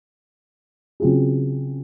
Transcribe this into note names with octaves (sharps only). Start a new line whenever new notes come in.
C#3 F#3 C4 F4 G#4